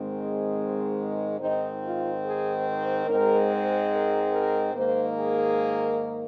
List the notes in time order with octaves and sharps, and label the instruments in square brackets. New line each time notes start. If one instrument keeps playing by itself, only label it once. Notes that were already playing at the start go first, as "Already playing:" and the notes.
Already playing: [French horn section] G#2 D#3 G#3 C4
G#4
G#2 D#3 C4 D#4
F4
G#4
C5
G#2 G#3 C4 A#4
C5
A#4
A#4
G#2 D#3 A#3 C5
G#4